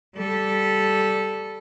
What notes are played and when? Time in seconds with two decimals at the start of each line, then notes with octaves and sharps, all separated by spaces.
0.16 G3 A4